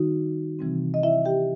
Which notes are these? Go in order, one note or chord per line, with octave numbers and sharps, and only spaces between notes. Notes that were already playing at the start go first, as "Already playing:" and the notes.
Already playing: D#3 G3 D#4 F#4
C3 E3 G3 C4
D#5
E4 E5
G4 G5